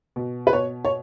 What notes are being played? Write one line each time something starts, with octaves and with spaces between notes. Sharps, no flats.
B2
B4
B2 C#5
C#5